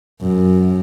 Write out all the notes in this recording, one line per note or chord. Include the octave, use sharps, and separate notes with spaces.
F#2